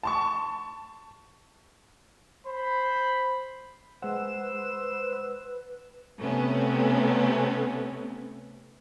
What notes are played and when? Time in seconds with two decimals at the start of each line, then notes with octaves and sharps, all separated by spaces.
0.03 A5 C6 C#6
2.47 C5 B5
4.02 G#3 B4 C5 F#5 E6
6.19 C3 A3 B3 C#4